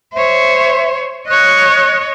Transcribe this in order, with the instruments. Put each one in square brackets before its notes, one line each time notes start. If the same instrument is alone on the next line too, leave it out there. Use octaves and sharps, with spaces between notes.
[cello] C5 C#5 [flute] E5
[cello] C#5 D#5 [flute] F#6